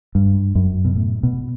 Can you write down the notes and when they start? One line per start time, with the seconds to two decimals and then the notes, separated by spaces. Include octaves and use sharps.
0.15 G2
0.55 F#2
0.85 B2
0.96 A2
1.23 B2